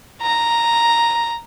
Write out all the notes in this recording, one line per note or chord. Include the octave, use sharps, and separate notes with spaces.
A#5